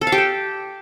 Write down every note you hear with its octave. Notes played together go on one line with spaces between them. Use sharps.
A4
F5
G4
A4